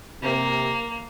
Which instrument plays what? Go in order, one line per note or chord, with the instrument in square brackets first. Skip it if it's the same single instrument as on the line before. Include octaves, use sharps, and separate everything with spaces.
[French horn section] C3 [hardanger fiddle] A#3